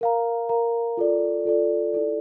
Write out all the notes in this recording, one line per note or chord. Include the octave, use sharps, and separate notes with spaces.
A#4 F5 A#5
A#4 F5 A#5
F4 A4 D5
F4 A4 D5
E4 A4 D5